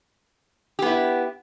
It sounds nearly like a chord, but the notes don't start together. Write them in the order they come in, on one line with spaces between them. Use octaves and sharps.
G4 B3 E4